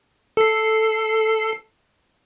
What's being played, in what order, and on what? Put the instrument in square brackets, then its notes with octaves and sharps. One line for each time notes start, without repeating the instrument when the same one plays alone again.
[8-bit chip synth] A4 C7